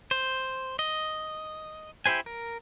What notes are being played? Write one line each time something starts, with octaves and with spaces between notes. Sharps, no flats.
C5
D#5
E4 G4 C5 G#5
A#4